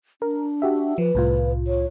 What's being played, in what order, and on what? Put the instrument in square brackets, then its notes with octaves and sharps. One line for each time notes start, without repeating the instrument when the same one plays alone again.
[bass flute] D4 [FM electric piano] A#4
[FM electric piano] F#4 G4 E5
[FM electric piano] F3 [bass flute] B4
[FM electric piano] C2 A2 F4
[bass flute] C#5